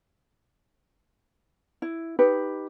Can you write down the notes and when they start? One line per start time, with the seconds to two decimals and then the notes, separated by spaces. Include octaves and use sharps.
1.82 E4
2.19 D#4 G4 B4